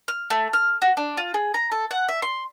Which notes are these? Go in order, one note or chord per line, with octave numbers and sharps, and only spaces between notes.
F6
A3
F6
F#4
D4
F4
G#4
A#5
A4
F#5
E5
C6